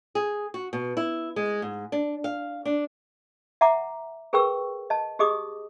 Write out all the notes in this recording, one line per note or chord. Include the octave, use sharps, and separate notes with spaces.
G#4
F#4
B2
E4
G#3
G#2
D4
F5
D4
E5 F#5 A#5 D6
G#4 A#4 B4 G5 C#6 E6
D#5 A5
G4 G#4 D#5 D6 D#6